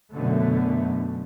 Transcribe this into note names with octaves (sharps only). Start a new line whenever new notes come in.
F#2 B2 D3 A3